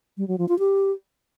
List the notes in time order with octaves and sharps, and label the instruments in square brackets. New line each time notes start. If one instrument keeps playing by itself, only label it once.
[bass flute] G3
F#3
F3
F4
G4